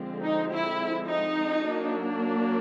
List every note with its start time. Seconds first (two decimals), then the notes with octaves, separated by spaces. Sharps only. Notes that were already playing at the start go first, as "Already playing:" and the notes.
Already playing: D3 F3 G#3 C4
0.23 D#4
0.51 E4
1.08 D#4
1.64 F#3 A#3 D4